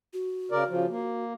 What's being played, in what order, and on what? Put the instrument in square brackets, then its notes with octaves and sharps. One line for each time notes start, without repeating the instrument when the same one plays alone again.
[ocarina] F#4
[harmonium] C#3 A#4 D5
C#3 F3
A#3